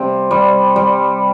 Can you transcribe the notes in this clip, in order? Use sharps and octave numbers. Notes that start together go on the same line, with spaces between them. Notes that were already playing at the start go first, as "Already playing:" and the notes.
Already playing: C3 G3 C4
G3
G3